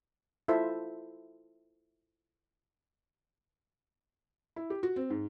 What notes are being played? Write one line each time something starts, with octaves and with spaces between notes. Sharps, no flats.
E4 F4 A4 C5 E5
E4
G4
F#4
C4
G#2